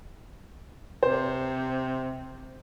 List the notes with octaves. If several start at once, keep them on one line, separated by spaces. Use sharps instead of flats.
C3 C5